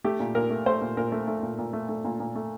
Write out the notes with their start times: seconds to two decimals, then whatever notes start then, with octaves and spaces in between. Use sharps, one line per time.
0.04 A3 G4
0.20 A#2
0.35 A#2 A#4
0.50 A3
0.66 A3 C5
0.81 A#2
0.97 A#2 A#4
1.12 A3
1.27 A3
1.43 A#2
1.59 A#2
1.73 A3
1.89 A3
2.05 A#2
2.20 A#2
2.35 A3